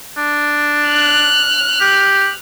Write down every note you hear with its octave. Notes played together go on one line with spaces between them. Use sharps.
D4
F6 F#6
G4